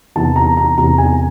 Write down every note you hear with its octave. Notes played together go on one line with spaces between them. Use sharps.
E2 C3 E3 A5
A#5
A#5
E2 C3 E3 A#5
G#5